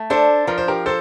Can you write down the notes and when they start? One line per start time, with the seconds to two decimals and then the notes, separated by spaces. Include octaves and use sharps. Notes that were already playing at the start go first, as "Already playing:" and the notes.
Already playing: A3
0.10 D4 A4 C5
0.47 F3 A#4
0.58 C5
0.68 G4 A#4
0.86 A4 C5